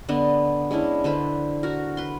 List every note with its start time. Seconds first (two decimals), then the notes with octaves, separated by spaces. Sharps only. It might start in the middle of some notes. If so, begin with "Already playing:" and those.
0.09 D3 B3 D4 D#5
0.71 G#3 C#4 D4 E4
1.04 D3 B4 C5 B5
1.63 F#4 A#4
1.97 B4 C6